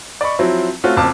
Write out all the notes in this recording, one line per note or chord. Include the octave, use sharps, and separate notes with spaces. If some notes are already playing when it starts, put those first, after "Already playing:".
D5 D#5 B5 C#6
F3 F#3 C4 E4
A3 C4 C#4 F4 F#4
F#1 F2 A5 D6